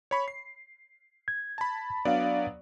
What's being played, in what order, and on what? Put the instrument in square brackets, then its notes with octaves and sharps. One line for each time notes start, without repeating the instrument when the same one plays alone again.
[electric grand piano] C#5 B5 C#6
C7
[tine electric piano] G#6
[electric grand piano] A5 B5
[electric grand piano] F#3 B3 D5 [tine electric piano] D4 F5